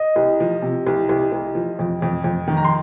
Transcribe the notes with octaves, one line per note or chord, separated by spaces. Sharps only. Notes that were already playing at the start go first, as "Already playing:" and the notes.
Already playing: D#5
C2
F3
C3
C2
C2
C2
F3
F2
F2
F2
D#3
A#5
C6